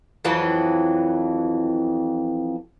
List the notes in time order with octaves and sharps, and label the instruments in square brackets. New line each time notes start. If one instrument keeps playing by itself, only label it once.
[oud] F2 E3 F#3